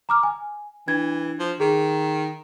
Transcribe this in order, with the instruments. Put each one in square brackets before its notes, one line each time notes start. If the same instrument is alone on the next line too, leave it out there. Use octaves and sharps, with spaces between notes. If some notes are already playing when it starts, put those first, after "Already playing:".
[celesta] A#5 D6 F6
G#5
[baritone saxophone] E3 [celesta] D4 G#6
[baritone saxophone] F3
[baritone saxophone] D#3 [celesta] G#4